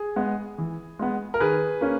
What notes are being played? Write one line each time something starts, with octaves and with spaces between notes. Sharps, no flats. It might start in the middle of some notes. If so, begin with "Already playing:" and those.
Already playing: G#4
G#3 B3
E3
G#3 B3
A#4
D#3 G#4 B4
A#3 C#4